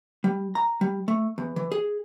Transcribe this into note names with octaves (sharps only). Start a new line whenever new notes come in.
G3
A#5
G3
A3
E2
E3
G#4